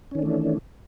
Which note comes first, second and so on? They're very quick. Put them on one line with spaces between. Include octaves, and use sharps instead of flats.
C#4 D#3 D4 A3 E3